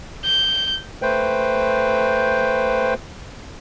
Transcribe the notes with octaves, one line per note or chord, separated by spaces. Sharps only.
G6
A3 B4 C5 G5